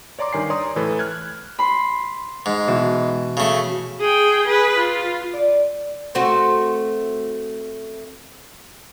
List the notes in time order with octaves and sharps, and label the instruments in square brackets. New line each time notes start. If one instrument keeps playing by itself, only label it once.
[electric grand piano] C#5 D5 A#5 C6 D6
G2 D#3 G#5 C7
C#5 D5 A#5 C6 D#6
A2 E3 A4 B4
F6 F#6 G#6
[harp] B5 C6
[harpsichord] G#2
[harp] B2 E3
[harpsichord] C#3 A3
[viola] G#4 G5
G#4 B4
F4
[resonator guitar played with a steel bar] D5
[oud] A3 C4 F#4